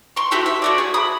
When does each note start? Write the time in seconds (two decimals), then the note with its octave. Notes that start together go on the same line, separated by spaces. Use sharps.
0.16 C6 C#6
0.31 E4 F#4 G4 A4
0.46 E5
0.62 A3 F#4 D5
0.78 G#4
0.94 B5 D#6